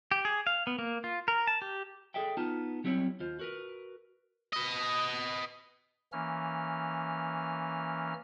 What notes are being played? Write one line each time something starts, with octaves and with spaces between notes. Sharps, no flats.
G4
G#4
F5
B3
A#3
F4
A#4
A5
G4
G#4 A4 D5 E5 G5
B3 D#4 F4 A5
F#3 G3 C4 E4 C#5
D#2 F4 C5
F#4 A#4 B4
B4 D#5
E3 A#3 C#4 F6